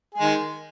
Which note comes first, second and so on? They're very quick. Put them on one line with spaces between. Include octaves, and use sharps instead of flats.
G#4 G#3 D#3